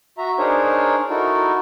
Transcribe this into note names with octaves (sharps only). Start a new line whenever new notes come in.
F#4 E5 A#5
D4 D#4 G#4 A#4 C5 C#5
D#4 E4 F#4 A4 A#4